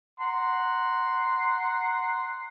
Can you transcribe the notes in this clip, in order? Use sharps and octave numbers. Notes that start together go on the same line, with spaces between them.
F#5 A#5 C6